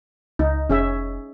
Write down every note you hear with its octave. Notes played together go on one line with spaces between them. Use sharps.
C#2 D#4
F1 C#4 G#4 E5